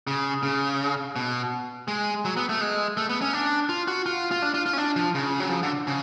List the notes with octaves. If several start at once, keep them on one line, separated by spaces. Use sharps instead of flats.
C#3
C#3
B2
G#3
F#3
B3
A3
G#3
A3
B3
C#4
D4
F4
F#4
F4
F4
D4
F4
F4
C#4
D4
F3
C#3
F#3
F3
D3
C#3